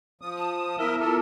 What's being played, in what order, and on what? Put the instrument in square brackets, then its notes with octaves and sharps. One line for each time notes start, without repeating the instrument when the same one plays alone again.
[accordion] F3 D#6
[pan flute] A5
[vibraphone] B3 E4 [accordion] A#4 E5
[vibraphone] F4 D6 [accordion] A4 A#4